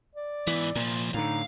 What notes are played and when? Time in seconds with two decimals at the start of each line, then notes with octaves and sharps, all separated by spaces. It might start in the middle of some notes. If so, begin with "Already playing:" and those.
0.15 D5
0.47 G#2 E3 B3
0.75 C2 A#2 F3
1.14 A2 D3 D#4 F5